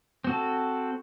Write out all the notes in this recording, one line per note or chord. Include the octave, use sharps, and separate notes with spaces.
C4 F#4 A4